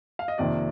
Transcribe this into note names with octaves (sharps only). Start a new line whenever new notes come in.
F5
D#5
F2 C3 D#3 A#3 D5